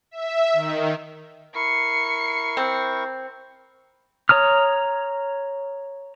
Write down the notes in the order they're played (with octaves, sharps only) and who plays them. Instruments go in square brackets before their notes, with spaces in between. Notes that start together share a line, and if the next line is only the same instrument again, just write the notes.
[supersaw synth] E5
D#3
[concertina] E4 A#4 C#6 [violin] C7 C#7
[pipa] C4
[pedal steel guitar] C#5 A#5 D#6 F6